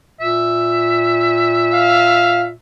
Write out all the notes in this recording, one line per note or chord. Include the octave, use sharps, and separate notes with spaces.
A#2 E5
F5